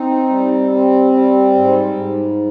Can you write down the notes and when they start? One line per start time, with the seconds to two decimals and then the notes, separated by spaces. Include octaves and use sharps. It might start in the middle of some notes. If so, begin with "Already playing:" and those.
Already playing: C4 D#4
0.29 G3
0.71 C4
1.13 G3
1.54 G#2
1.96 G#2